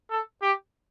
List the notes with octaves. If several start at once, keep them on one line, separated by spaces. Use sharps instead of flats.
A4
G4